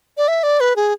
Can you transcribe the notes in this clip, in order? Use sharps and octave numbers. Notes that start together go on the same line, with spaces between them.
D5
E5
D5
B4
G#4